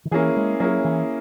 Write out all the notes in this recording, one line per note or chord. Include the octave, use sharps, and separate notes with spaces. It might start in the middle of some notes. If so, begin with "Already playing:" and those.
D#3
E3 A#3 C#4 E4 G#4
G#3
F#3 A#3 C#4 E4 G#4
E3